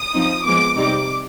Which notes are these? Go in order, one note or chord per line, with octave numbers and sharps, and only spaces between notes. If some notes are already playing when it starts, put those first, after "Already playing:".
Already playing: D#6
F3 C4 D#4
F3 G#3 B3 D6
C3 G3 C4 D#4 D6